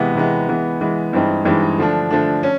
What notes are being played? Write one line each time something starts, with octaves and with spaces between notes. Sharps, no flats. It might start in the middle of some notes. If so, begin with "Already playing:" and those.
Already playing: C3 E3 G#3 B3
C3 E3 G#3 B3
E3 G#3 B3
E3 G#3 B3
G2 E3 G#3 C4 D#4
G2 E3 G#3 C4 D#4
D3 F3 A3 D4
D3 F3 A3 D4
C#4